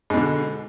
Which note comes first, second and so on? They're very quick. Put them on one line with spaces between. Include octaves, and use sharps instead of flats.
G#2 B2 D3